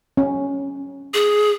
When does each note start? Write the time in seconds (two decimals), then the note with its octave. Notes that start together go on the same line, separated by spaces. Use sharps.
0.17 C#4
1.14 G#4